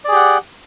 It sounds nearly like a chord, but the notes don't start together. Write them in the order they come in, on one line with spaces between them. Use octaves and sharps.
D5 G#4 G4 F#5